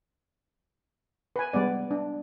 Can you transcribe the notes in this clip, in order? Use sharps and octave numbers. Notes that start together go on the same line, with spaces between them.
B4 G#5
G3 G#3 B3 D5
D4